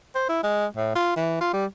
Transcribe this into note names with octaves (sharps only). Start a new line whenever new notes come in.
C5
E4
G#3
A2
F4
E3
F4
G3